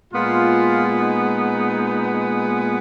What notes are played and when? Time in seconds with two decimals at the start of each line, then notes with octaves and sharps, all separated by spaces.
0.13 A#2 G#3 B3 F4
0.98 D#4